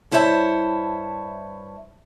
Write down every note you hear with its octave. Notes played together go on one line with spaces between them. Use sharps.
G2 E4 C5 C#5 E5 A5